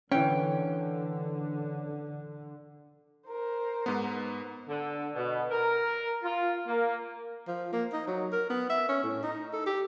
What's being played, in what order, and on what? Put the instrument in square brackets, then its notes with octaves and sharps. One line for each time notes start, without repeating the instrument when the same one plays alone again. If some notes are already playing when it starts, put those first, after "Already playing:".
[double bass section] D3 [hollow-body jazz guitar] E3 C#4 [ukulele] G5
[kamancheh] A#4 C5
[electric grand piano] G#2 B3
[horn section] D3
B2
A#4
F4
A#3
[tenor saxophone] F3
A#3
D#4
F#3
A#4
B3
E5
C#4
A2
D#4
A4
G4